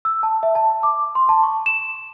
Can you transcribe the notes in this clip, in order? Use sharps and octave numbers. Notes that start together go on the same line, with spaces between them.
E6
A5
E5
A5
D6
C6
A5
C#6
E7